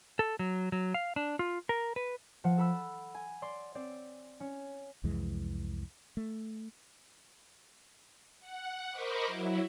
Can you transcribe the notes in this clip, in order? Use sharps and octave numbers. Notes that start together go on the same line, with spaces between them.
A4
F#3
F#3
F5
D4
F4
A#4
B4
F3 F#5
A4 B5 E6
G#5
D5 C6
C4 D5
C#4
C2 F2 E3 G#3
A3
F#5
A#4 C5 D#5 B5 C#6 D6
F#3 E4